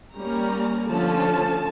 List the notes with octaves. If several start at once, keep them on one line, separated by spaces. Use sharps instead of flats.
G3 A#3 C#4 A#5
D3 F3 A3 C#4 A5